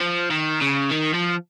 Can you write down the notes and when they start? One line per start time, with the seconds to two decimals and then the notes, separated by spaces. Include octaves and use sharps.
0.01 F3
0.31 D#3
0.62 C#3
0.91 D#3
1.15 F3